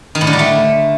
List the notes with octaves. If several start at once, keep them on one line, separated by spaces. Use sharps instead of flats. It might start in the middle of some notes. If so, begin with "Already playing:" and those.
D#3
A2
D3
G3
A3